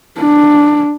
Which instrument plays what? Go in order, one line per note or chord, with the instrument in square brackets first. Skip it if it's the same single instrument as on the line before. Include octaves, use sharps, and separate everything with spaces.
[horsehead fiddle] D4